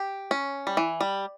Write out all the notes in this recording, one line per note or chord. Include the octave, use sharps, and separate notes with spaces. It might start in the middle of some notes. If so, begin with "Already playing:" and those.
Already playing: G4
C#4
G3
E3
G3